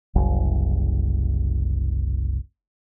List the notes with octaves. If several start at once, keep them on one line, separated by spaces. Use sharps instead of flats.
F#1 C2